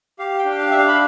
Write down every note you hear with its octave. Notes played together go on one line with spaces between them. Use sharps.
G4 F5
G5
D4
F5
D4 E5
F5
B5